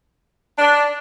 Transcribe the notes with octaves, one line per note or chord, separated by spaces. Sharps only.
D4